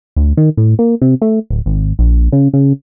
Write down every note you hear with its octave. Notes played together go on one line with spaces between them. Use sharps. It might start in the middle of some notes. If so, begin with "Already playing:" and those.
D2
D#3
A2
A#3
C3
A3
D1
G#1
A#1
C#3
C#3